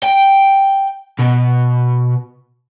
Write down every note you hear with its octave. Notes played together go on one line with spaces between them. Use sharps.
G5
B2